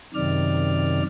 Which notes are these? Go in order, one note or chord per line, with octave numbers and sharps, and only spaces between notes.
F#2 C3 D#3 D5 F6